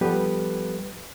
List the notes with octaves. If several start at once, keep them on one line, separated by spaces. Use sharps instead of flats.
F3 G3 B3 G4 A4 B4